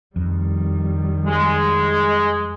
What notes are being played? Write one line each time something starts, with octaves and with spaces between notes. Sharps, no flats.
F2 D#3 G3
G#3